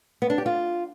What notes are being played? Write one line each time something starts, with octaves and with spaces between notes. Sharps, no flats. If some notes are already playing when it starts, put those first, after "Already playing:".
B3
D4
G4
F4